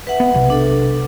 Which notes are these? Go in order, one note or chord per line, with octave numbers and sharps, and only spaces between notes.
B4 E5 F#5
B3
B1 C3
D4 A4